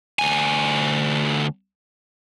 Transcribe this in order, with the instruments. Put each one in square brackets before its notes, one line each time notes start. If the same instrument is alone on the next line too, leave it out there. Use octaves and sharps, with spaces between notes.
[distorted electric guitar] D2 G#5